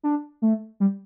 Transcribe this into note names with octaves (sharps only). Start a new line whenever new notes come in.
D4
A3
G3